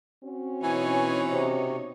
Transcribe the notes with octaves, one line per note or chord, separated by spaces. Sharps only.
C4 C#4 F#4
B2 E3 D#4 C#5 G#5
C3